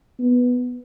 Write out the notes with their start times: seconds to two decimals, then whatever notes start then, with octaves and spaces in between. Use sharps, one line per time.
0.19 B3